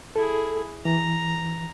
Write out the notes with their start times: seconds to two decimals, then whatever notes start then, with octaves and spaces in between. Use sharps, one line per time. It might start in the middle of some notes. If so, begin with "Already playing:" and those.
0.16 E4 G#4 A4
0.85 E3 A#5